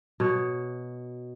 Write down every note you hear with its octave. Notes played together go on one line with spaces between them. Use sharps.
B2 C#5